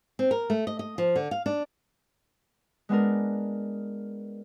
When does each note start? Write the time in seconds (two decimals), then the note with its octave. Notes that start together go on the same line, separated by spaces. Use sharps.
0.19 C4
0.31 A#4
0.50 A3
0.67 D#5
0.79 D#5
0.98 F3
1.16 D3
1.31 F5
1.46 D4
2.89 G#3 B3 D4 A#4